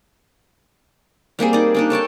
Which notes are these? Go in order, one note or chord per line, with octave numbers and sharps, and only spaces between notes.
G3 A#3 C4 G#4
D#4 D5
A#3 D4 D#4
A4 C#5 G5 A5